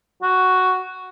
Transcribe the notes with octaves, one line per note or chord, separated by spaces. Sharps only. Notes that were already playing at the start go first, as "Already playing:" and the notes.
F#4